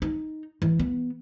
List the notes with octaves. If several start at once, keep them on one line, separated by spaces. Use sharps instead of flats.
D#4
E3
B3